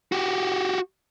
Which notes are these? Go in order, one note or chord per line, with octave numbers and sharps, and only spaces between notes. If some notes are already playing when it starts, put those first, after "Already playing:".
F#4 G4